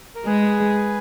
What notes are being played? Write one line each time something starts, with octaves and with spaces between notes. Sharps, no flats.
A#4
G#3 G#4 B4